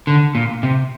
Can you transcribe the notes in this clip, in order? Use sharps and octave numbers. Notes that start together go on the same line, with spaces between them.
D3
A#2
C3